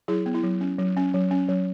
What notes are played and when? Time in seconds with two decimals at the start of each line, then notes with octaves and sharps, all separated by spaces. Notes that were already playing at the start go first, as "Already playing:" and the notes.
0.08 F#3 E4 G#4
0.26 B3
0.35 E4
0.43 F#3
0.61 C#4
0.78 F#3
0.96 C#4
1.14 F#3
1.31 C#4
1.49 F#3